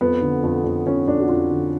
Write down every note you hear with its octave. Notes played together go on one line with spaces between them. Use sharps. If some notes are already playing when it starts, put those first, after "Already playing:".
F2 B3
D3
F2
F2
F2 C#4
F2 D4
F#4
F2 F4
D3